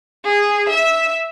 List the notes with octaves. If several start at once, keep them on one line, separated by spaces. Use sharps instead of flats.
G#4
E5